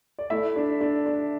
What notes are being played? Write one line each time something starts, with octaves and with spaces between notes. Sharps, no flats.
D5
A3 E4 E5
D4
D4
D4